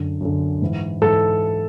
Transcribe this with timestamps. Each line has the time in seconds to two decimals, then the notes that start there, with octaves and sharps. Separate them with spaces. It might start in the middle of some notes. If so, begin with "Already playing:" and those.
Already playing: F#2 D3
0.21 F#2 D3
0.62 G#2 E3
1.01 G#2 E3 A4